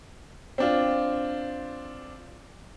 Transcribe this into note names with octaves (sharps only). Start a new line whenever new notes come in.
C4 D4 F4